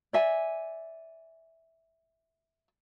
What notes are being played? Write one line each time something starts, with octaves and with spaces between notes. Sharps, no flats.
D5 E5 G#5